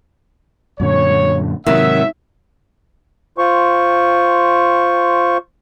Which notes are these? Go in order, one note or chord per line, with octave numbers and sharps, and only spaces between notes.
F#2 A#2 D3 C#5
G#2 C3 D#3 F#3 E5
F4 C5 C#6